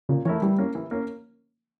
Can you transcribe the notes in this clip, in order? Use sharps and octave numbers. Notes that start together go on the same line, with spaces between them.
A#2 C#3
E3 A3 E4 A#4 C#5
E3 G3
A#3 C#4
E3
A#3 C#4